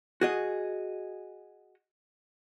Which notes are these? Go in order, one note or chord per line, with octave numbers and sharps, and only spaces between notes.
F#4 G#4 D#5